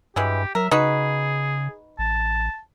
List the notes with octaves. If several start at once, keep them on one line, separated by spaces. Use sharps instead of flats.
G2 E3 F#3 G#3 G4
F#3 A#4 E5
C#3 D#4 F#4 G#4 B4
A1 A5